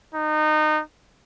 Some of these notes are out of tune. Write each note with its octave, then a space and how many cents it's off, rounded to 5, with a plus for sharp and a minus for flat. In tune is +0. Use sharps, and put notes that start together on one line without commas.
D#4 -25